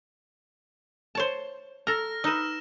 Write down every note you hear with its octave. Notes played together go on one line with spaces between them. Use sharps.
C5 C#5 A5
A4 A#5 F6 A#6
D#4 B4 E6 E7